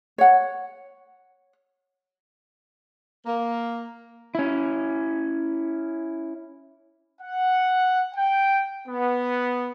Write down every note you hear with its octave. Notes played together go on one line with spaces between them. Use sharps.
C#5 F#5
A#3
C#4 E4
F#5
G5
B3